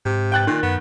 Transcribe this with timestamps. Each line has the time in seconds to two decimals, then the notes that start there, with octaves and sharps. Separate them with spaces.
0.05 G#2 C3
0.32 G5 F#6 A6
0.47 A#2 D#3
0.63 F#2 B3